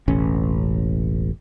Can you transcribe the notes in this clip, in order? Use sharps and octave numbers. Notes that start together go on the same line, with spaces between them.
E1 A1 C#4